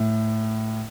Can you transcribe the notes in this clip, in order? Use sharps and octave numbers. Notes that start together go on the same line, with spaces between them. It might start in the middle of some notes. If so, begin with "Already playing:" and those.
Already playing: A2